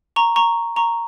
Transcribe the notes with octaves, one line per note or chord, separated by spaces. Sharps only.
A#5 C#6
A#5 C#6
A#5 C#6